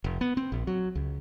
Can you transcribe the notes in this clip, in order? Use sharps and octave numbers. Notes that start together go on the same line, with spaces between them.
F1
B3
C4
A#1
F#3
C#2